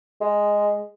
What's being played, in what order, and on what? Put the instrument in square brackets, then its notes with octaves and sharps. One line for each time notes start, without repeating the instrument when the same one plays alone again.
[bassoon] G#3